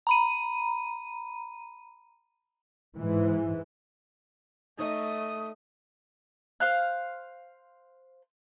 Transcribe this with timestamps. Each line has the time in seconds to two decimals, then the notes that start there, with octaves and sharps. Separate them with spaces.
0.07 A#5 B5 D#7
2.97 G#2 E3
4.79 A3 D#4 C#5 D#5 D#6
6.60 C5 F5 F#6